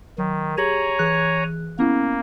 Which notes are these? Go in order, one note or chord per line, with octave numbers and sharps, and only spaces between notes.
D#3 F#3
G4 G#4 C#5 G#5 A#5 F#7
E3 G#4 F#6
A#3 B3 C#4 E4